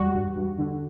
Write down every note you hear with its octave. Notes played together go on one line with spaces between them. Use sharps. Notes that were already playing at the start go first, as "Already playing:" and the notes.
Already playing: E2 G3 F#4
G2
G2
D3